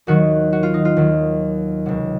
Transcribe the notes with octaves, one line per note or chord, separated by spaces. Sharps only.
D#2 D#3 F#3 F#4
F#4
F4
D#4
F4
D#2 D#3 F#3
C#2 C3 F#3